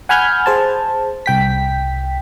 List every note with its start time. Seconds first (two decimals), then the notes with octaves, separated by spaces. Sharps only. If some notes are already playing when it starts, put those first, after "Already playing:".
0.09 F#5 G#5 B5 F6 G6 G#6
0.46 G#4 C5 A5
1.26 C2 G5 B6